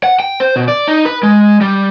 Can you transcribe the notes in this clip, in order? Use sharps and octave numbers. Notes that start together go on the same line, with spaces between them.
F#5
G5
C5
B2
D5
D#4
B4
G#3
G3